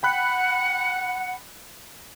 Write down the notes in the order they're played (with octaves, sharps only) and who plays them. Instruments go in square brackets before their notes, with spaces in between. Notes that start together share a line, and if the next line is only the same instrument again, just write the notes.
[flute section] F#5 [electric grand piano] G5 B5 F#6